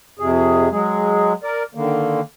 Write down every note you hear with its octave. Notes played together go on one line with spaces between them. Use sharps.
F2 C3 G#4
F#3 G#3 G#4
A#4 D5
D3 D#3 A#3